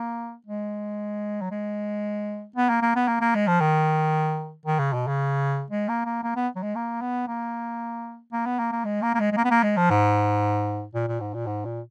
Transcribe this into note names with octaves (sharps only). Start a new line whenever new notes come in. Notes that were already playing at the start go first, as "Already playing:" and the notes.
Already playing: A#3
G#3
F#3
G#3
B3
A#3
A#3
B3
A#3
A#3
G#3
F3
D#3
D#3
C#3
B2
C#3
G#3
A#3
A#3
A#3
B3
F#3
G#3
A#3
B3
A#3
A#3
B3
A#3
A#3
G#3
A#3
A#3
G#3
G#3
A#3
B3
A#3
G#3
F3
G#2
A#2
A#2
G#2
A#2
G#2
A#2